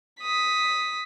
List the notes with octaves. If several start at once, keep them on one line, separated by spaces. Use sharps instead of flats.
D#6 B6